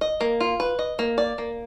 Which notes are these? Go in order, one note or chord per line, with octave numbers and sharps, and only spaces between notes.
D#5
A#3
F4
B4
D#5
A#3
D5
A#3